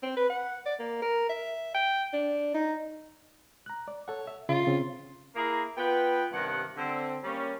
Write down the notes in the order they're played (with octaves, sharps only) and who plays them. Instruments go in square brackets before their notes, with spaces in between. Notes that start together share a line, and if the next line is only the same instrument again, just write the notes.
[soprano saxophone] C4
B4
F#5
D5
A#3
A#4
E5
G5
D4
D#4
[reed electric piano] A#5 F#6
D5
[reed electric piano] A4 F#5 [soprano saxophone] C#5
[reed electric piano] E5
[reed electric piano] C#3 [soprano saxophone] F4
[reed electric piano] C#3 C4
[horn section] A#3 E4 G#4 A#4 A#5
B3 F4 B4 G5
G2 C3 D#3 F#5
D3 C4
G3 A#3 C#4